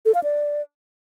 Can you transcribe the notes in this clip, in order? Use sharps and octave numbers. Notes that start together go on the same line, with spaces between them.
A4
F5
D5